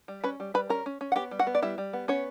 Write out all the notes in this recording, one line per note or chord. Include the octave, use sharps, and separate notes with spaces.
G3
C#4 B4 B5
G3
G3 B4 B5
C#4 A#4 A#5
C#4
C#4
F#5
B3 G4 G5
G3
F#4 F#5
B3
D5
G3 E4 E5
G3
B3
B3 C#4 C#5